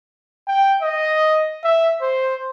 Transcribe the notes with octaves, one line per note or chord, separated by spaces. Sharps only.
G5
D#5
E5
C5